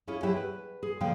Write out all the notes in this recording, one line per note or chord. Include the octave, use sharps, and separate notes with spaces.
C#4 E4 F4 G#4
F#3 E4 G4 G#4 C5 E5
B4
G#4
A#2 D3 F3 G#4 F5 G5